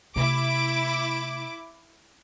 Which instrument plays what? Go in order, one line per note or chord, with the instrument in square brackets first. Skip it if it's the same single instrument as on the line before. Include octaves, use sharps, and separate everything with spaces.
[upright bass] C3 A3 [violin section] E4 D6